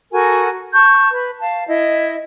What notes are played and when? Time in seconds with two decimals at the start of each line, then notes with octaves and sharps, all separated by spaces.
0.11 F#4 A4 A#4 G#5
0.73 A5 C#6 G6
1.12 B4
1.41 F5 A5
1.67 E4 D#5